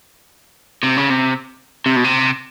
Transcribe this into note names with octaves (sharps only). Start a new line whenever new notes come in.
C3
C#3
C3
C3
B2
C3